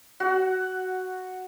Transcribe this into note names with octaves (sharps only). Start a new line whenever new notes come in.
F#4 F#5